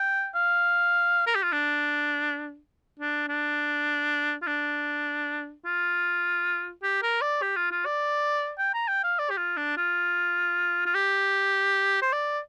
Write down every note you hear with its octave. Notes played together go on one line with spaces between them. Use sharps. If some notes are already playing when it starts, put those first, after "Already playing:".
Already playing: G5
F5
A#4
G4
F4
D4
D4
D4
F4
D4
F4
G4
A#4
D5
G4
F4
F4
D5
G5
A#5
G5
F5
D5
G4
F4
D4
F4
F4
G4
C5
D5